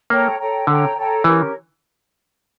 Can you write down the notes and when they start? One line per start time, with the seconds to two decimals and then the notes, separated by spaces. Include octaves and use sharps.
0.10 A#3 A4 C#5 G5 A#5
0.39 A4 C#5 G5 A#5
0.67 D3 A4 C#5 G5 A#5
0.96 A4 C#5 G5 A#5
1.24 E3 C#4 G4 A#4 C#5